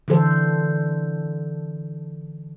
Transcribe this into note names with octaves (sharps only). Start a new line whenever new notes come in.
D3 E3 A4 C5